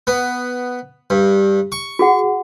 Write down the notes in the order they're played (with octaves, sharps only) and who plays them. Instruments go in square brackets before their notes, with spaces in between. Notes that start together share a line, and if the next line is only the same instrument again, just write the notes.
[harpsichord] B3
G2
C#6
[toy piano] F#4 G#4 F#5